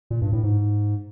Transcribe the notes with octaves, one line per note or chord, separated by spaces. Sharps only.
A#2
G2
A2
G#2